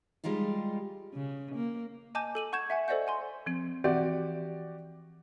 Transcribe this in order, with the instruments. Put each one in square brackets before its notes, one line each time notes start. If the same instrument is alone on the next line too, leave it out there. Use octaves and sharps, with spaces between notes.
[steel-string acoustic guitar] G3 G#3 D#4 F4 G4
[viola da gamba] C#3
A#3
[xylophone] D#5 G#5 A5 D6 G6 D#7
A4 D#7 F#7
F#5 C#6 G6 G#6 E7
E5 F#5 G#5 C#6
A4 C5 D5 D#5 F#5 G6
F#5 G#5 C6
[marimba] F3 C4
[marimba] E3 C4 [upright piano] F#4 G4 D5